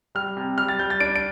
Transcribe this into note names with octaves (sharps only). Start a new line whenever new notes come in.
G3 F6
C3
G3 F6
A6
G3 G6
A6
D4 D7
D7